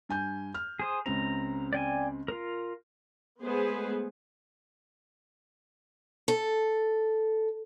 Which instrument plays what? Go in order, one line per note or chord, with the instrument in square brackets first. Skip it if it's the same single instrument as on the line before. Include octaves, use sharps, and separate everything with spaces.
[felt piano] G2 G#5 G6
F6
[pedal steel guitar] G#4 C5 D#6
[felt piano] C#2 C#3 C4 [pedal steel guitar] A#5
[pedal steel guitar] D5 G5 G#5
F4 A#4
[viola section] G#3 A3 B3 G#4 B4 C5
[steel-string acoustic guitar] A4